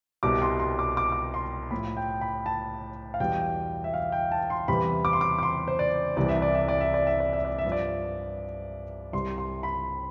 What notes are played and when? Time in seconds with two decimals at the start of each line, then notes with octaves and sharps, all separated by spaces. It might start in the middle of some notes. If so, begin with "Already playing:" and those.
0.23 C2 B2 G3 D6
0.42 C6
0.60 C6
0.79 D6
0.97 D6
1.12 D6
1.34 C6
1.71 A2 F3 B5
1.97 G5
2.21 B5
2.46 A5
3.14 F5
3.20 E2 B2 G3 G5
3.84 E5
3.94 F5
4.12 G5
4.32 A5
4.50 C6
4.68 E2 C3 E3 G3 B5
5.05 D6
5.13 C6
5.21 D6
5.39 D6
5.43 C6
5.68 C5
5.79 D5
6.16 C2 C3 E3 G3 D5
6.29 E5
6.42 D5
6.55 E5
6.68 D5
6.81 E5
6.94 D5
7.07 E5
7.20 D5
7.33 E5
7.45 D5
7.59 E5
7.65 G2 F3
7.72 D5
9.13 C2 C3 G3 C6
9.38 C6
9.63 B5